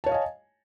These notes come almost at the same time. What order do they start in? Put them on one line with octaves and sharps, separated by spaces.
A5 C#5 F5 D#5 G#5